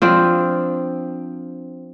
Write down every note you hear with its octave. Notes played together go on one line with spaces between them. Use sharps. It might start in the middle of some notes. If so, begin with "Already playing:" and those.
F3 C4 D4